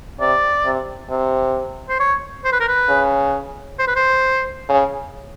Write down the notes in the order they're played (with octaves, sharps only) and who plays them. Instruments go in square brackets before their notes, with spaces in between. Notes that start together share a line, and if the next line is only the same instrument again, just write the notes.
[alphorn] C3 [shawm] D5
[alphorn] C3
C3
[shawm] C5
C#5
C5
B4
A#4
B4
[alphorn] C#3
[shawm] C5
B4
C5
[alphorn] C#3